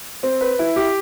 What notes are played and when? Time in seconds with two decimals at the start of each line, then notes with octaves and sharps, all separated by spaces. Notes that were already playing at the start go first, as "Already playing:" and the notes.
0.23 C4
0.41 B4
0.59 E4
0.76 G4